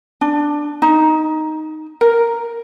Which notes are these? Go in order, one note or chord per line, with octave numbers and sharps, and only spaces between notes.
D4
D#4
A#4